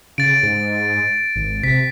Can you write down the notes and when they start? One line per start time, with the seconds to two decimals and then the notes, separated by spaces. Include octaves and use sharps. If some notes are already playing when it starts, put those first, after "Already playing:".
0.18 C#3 A6 D7
0.43 G#2
1.36 G#1
1.63 C3 B6